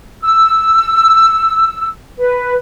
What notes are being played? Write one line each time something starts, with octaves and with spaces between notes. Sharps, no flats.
E6
B4